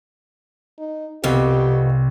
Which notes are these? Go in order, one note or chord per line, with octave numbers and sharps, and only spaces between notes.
D#4
C2 F2 B2 G4